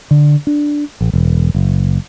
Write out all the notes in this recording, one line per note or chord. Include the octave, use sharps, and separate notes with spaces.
D3
D4
A1
E1
F#1